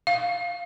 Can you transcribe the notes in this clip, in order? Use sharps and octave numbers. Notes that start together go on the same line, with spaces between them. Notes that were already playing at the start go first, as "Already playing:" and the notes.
F5